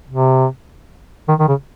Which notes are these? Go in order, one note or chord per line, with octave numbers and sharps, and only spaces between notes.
C3
D#3
D#3
C#3